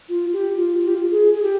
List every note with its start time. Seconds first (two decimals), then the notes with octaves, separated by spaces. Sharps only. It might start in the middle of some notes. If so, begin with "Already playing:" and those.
0.09 F4
0.33 G4
0.57 F4
0.80 F4
0.88 G4
0.95 F4
1.12 G#4
1.33 G#4
1.43 G4